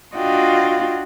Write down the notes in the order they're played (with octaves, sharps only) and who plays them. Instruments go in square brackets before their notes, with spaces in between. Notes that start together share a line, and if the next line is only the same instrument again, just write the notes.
[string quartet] D4 F4 F#4 D#5 F5 G5